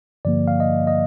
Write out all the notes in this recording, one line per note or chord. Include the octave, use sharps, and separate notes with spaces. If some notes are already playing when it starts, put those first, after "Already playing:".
G2 D3 F3 A#3 D5
F5
D#5
D#5